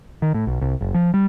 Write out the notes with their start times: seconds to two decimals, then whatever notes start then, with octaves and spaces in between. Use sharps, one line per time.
0.22 D#3
0.34 A2
0.47 B1
0.61 C2
0.81 F#1
0.94 F3
1.14 G3